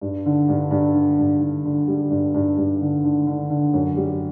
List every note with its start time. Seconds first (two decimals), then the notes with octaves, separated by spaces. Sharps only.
0.01 G2
0.26 D3
0.48 G2
0.71 G2
0.94 D3
1.19 G2
1.41 D3
1.64 D3
1.88 G3
2.10 G2
2.34 G2
2.57 G2
2.81 D3
3.04 D3
3.27 D3
3.50 D3
3.74 F#2
3.96 G3